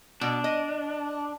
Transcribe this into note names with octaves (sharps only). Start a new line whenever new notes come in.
B2 D4
D#5